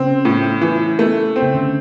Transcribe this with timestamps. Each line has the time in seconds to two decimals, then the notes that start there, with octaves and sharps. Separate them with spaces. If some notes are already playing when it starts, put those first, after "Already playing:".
Already playing: C#3 C4
0.25 A2
0.61 E3
0.99 A3
1.36 C4
1.42 C#3
1.55 D3